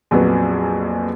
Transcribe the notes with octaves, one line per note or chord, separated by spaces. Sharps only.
A#1 F2 F#3 B3